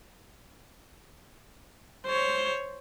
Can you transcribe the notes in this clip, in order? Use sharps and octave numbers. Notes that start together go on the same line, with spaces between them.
C5 C#5